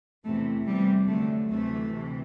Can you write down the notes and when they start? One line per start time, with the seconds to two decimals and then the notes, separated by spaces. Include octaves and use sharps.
0.25 E2 C3 E3 A3
0.67 E2 C3 E3 G3
1.08 F#2 D3 A3
1.50 D2 C3 E3 A3
1.91 D2 C3 E3